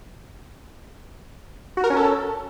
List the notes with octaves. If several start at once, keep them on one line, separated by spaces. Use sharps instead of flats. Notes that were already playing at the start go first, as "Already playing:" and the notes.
F#4
A#4
C#4
A4